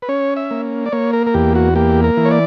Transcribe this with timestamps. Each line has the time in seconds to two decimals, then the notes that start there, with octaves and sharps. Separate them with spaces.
0.02 B4
0.09 C#4 C#5
0.36 E5
0.51 A#3
0.86 D5
0.92 A#3 C#5
1.13 A#4
1.27 A#4
1.34 E2 G4
1.55 F#4
1.76 A#3 G4
2.04 A#4
2.17 E3
2.25 C#5
2.31 D5